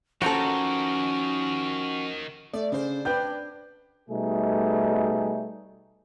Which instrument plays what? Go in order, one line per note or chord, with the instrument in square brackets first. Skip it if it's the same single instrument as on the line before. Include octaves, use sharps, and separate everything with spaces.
[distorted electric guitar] D#3 G4 [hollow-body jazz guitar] F3 A4 [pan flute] C#4 [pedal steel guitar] F#4 F#5 A#5
[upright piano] A3 [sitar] D5
[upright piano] C#3 [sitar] D4 C5
[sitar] D4 [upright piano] B4 G5 G6
[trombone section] B2 G3 A3 D#4 G#4